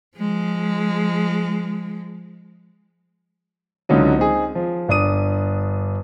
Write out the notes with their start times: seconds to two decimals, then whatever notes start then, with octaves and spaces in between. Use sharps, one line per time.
0.18 F3 G#3
3.89 C#2 D3 F#3 D#4
4.18 C4 D#4 G#4
4.55 F3
4.88 G1 D4 D#6 D#7